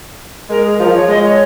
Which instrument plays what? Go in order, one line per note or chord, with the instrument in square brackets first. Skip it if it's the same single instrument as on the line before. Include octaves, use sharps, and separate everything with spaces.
[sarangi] G#3 [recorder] A#4
[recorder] G#4
[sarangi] F3 [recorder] A#4
[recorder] C#5
[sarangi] G#3 [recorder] D#5
[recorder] C#5